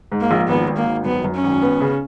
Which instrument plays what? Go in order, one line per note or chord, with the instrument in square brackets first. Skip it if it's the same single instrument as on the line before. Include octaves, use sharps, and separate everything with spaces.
[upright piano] G#2
[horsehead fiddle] A#3
[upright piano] A#1
[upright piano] G#1 [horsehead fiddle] B3
[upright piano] G#1
[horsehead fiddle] A#3
[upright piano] G#1
[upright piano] F#2 [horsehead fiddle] B3
[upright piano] F#2
[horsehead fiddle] C#4
[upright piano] G#1
B3
C#3